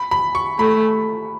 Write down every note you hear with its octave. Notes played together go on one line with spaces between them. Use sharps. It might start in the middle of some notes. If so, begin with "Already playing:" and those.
Already playing: B5
B5
C#6
A3 B5